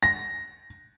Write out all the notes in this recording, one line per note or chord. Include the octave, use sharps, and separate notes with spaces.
A#6